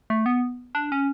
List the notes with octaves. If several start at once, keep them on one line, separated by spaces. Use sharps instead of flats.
A3
B3
D4
C#4